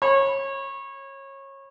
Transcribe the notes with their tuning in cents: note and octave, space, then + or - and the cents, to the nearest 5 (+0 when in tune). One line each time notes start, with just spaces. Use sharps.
C#5 -25 B5 -10